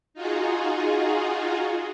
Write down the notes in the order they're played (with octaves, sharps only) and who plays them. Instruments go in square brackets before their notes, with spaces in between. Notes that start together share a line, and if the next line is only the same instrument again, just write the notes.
[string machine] D#4 F4 F#4 G#4